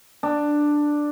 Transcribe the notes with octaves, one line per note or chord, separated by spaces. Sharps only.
D4